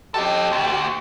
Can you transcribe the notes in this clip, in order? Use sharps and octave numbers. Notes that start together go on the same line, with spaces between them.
G4 A4 D#5
D2